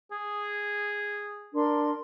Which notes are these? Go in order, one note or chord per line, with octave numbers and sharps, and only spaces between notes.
G#4
D4 A#4 C6